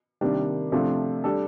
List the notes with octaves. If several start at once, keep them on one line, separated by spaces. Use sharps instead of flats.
C3 D#3 G3 A#3 D4
C3 F3 A3 D4 F4
G3 D4 A4